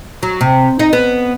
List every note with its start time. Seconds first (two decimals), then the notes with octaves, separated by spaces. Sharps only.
0.23 F#3
0.41 C3
0.79 D#4
0.93 B3